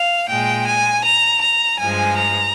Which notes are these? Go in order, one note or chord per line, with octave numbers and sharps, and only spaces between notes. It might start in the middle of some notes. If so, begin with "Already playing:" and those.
Already playing: F5
A#2 G#3 G5
G#5
A#5
A#5
G2 F3 G#3 G#5
A#5